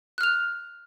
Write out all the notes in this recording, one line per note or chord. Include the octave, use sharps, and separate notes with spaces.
F6 F#6 F7